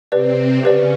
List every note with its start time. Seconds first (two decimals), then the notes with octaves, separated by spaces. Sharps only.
0.12 C3 C4 G4 B4 D5
0.63 C#3 C#4 G4 B4 D5